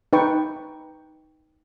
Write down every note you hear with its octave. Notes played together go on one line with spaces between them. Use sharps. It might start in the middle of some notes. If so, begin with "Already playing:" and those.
D#4 B4 G5 C#6